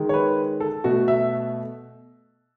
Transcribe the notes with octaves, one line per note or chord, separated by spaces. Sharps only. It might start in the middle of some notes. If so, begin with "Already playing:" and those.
Already playing: D#3 G#3
C#5
B4
A4
B2 A3 F#4
E5